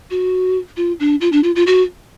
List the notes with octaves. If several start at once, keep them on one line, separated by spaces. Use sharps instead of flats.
F#4
F4
D4
F4
D4
F4
F4
F#4